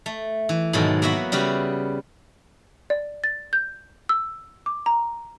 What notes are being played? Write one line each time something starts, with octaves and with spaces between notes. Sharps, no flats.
A3
E3
G#2 B2 D#3 F#3 A4
A#3 B3 F#4 E5 F#5
C#3 G3 F#4 B4
D5
A6
G6
E6
D6
A#5